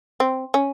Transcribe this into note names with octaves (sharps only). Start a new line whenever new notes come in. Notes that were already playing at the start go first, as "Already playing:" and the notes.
C4
C#4